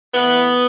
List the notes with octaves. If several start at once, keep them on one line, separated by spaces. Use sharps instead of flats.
A2 E3 B3